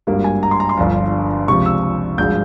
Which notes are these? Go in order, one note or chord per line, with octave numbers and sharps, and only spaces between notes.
G#1 G2 G3 A#3
G#5
A#5
C6
A#5
C6
G1 G2 F3
C#2 C3 F3 C#6
E6
G#1 G2 F3 G#3 G6